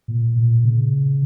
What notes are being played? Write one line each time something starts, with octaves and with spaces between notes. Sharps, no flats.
A#2
A#2
C#3